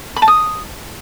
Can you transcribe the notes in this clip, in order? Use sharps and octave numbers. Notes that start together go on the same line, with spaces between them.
B5
A5
D#6